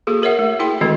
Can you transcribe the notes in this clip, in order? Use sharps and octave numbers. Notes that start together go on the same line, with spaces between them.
A#3 F#4 G#4 A4
G#4 A#4 C#5 E5 F#5
A3
E4 G#4 G5 C6
D#3 E3 G#3 C4 F#4 A4